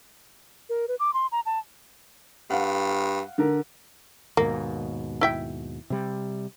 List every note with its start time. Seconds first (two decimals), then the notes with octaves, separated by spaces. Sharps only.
0.69 A#4
0.88 B4
1.00 D6
1.14 C6
1.32 A#5
1.46 A5
2.50 G2 F5 F#5
3.38 D3 A#4
4.37 D#2 G#2 B2 A#3
5.21 E4 E5 G5
5.90 C3 G3